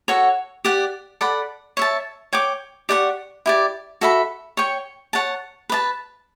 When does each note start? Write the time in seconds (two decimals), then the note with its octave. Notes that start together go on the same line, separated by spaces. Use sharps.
0.08 F#4 A4 C#5 F#5
0.65 G4 D5 F#5
1.21 A4 D5 F#5 B5
1.77 C#5 E5 A5
2.33 C#5 G5 D6
2.89 G4 D5 F#5 C#6
3.46 E4 G4 D5
4.01 F#4 A4 E5 B5
4.57 C#5 G5 C#6
5.13 C#5 F#5 A5
5.69 B4 D5 A5